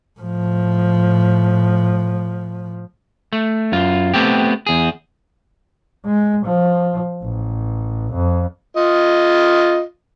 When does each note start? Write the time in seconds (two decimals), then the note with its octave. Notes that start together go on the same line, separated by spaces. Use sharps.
0.20 A2 F3
3.33 A3
3.72 F#2 F4
4.14 A3 B3 C4 G4
4.67 E2 G#4
6.05 G#3
6.45 F3
7.23 A1
8.13 F2
8.77 F4 D#5